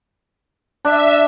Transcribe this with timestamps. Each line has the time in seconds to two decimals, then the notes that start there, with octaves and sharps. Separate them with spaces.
0.85 D4 E5